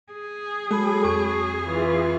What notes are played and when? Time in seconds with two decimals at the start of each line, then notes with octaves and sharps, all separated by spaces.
0.12 G#4
0.71 F#3 G#3 A4 B5
1.04 F2 C#6
1.64 E3 F4